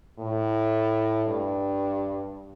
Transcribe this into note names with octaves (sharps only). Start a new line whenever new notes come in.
A2
G2